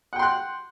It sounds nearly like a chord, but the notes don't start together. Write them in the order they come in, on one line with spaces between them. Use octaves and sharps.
F#5 G5 C6 F#6